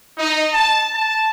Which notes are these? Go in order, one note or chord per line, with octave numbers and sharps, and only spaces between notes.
D#4
A5
A5